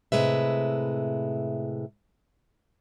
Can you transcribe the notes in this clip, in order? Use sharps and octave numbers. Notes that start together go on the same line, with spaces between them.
A2 C3 G#3 B4 E5